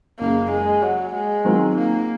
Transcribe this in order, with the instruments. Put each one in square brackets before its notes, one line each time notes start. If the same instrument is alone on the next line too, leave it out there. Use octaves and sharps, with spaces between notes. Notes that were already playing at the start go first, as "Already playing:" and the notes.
[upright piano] F#1 F#2 C#3 [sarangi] A#3
[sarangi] G#3
F#3
G#3
[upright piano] D#3 F#3 C4 F4 A#4
[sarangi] A#3